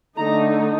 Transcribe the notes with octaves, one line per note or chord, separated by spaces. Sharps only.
D3 A3 D#4 A#5